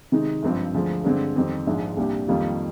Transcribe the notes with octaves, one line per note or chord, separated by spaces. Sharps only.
C3 D#3 G#3 D#4
G#1 G2 F3 C4
D2 D3 F3 G#3
G2 D3 G#3 C4
F2 D#3 G3 C4 G4
A#1 G#2 F3 G#3 D4
C2 A#2 G3 D4 G4
F2 D#3 G3 A#3 F4